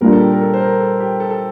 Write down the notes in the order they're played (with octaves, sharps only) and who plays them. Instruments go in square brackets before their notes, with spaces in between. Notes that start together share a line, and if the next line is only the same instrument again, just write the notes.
[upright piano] A#2 G3 D4 F4 [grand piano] A#4
[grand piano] A4
G4
A#4
A4
C5
A#4
A4
G4
A4
A4